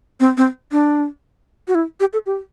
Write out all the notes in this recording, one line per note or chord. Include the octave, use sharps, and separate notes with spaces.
C4
C4
D4
F#4
E4
G4
A4
G4